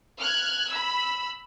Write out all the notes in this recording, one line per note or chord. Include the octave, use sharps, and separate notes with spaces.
F6 F#6 G#6
B5 E6